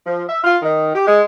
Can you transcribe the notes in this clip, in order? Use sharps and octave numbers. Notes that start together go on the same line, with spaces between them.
F3
E5
F4
D#3
G4
G#3